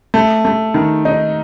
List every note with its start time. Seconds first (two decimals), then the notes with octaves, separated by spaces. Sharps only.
0.14 A3
0.45 A3
0.74 D#3
1.05 D#4